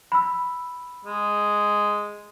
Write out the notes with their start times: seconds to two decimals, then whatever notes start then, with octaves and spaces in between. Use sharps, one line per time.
0.12 B5 E6
1.05 G#3